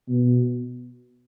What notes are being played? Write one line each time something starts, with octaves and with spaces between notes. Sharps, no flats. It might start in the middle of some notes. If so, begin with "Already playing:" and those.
B2